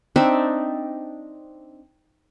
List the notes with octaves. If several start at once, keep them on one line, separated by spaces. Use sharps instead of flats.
C4 D4 D#4 E5